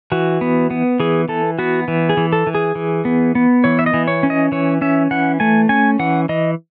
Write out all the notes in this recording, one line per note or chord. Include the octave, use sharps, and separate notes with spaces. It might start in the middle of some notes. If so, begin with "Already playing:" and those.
E3 F#4
B3
B3
E3 G#4
E3 A4
B3 F#4
E3
G#4
E3
A4
E3
G#4
E3
B3
B3
E3 C#5
E5
D#5
E3
C#5
C#4
D#5
E3 C#5
C#4 E5
E3 F#5
A3 G#5
C#4 G#5
E3 F#5
E3 D#5